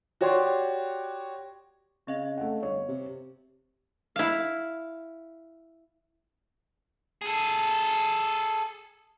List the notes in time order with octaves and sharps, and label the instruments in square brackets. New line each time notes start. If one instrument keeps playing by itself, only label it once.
[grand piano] F#4 G4 C#5 D5 C6
[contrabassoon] C#3 [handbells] C4 D#5 F5
[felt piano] A3 F#5
[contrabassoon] G1 [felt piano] C#5
[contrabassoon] C3
[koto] E4 F5
[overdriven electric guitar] G#4 A4